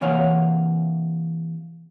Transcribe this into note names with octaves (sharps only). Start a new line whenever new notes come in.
C3 E3 A#3 C#5 F5 F#5